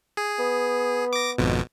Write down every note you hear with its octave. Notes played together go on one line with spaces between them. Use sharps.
G#4
B3
D6 A#6
G#1 F2 B2